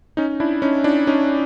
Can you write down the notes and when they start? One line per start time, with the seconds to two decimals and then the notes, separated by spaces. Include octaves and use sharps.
0.17 C#4 D#4
0.40 D4 E4
0.62 C#4 D#4
0.84 D4 E4
1.07 C#4 D#4